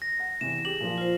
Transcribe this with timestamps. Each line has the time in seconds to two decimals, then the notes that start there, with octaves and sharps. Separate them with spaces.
0.02 A#6
0.19 F#5
0.41 E2 C3 E7
0.65 G4 G#4 F#7
0.80 A#2 F3
0.98 F4 C5